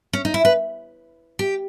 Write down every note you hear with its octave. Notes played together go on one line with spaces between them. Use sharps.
C#4
D#4
E4
B4
G4